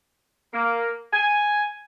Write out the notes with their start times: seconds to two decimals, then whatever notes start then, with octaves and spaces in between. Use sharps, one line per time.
0.54 A#3
1.13 G#5